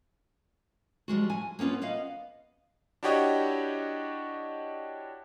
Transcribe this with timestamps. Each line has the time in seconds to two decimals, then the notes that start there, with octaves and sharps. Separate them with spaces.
1.08 F3 G3 G#3 F#4
1.30 G#5
1.59 A#3 B3 C#4 F4 B4
1.82 B3 B4 D#5 F5
3.03 D4 E4 F#4 G4 C#5 D#5